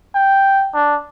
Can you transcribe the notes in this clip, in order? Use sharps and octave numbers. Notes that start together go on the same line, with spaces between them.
G5
D4